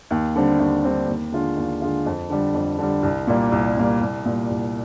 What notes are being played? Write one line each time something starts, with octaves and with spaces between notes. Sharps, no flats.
D#2
D3 G3 C4
D#2
D3 G3 C4
D#2
D3 G#3 D4 F4
D#2
D3 G#3 D4 F4
F2
D3 G3
F2
D3 G3
C2
A#2 G3 A#3
C2
A#2 G3 A#3
C2
A#2 G3
C2